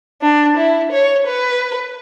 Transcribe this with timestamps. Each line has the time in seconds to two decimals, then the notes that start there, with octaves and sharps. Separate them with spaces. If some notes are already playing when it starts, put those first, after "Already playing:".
0.22 D4
0.57 E4
0.92 C#5
1.26 B4